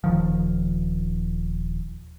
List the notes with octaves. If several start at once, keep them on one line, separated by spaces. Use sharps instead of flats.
D#1 D#3 F3